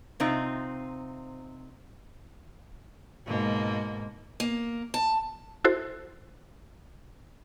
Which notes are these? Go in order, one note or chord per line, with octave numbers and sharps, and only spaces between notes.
C3 C4 D#4 F4
G#2 B2 A#3
A#3
A5
E4 F#4 A4 C5